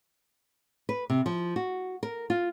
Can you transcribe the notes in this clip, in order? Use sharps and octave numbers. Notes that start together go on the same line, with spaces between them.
B4
C3
F3
F#4
A#4
F4